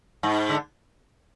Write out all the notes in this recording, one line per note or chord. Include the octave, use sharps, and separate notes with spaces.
G#2
D3